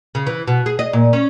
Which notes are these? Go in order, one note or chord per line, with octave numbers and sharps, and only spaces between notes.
C#3
E3
B2
G#4
D#5
A#2
C#4